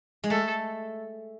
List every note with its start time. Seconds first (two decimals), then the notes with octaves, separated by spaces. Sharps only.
0.24 G#3
0.30 A3 A4